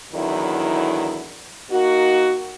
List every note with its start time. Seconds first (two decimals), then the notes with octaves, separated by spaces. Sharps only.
0.13 E2 D3 D#3 F#3 E4
1.71 A#3 D#4 F#4